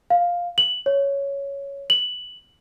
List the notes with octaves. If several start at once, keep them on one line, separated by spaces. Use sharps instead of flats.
F5
F#7
C#5
F#7